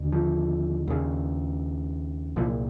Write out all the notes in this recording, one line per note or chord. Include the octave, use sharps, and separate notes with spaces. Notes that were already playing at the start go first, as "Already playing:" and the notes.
Already playing: D#2 D3
F3
D#2 C#3
C2 A#2 F3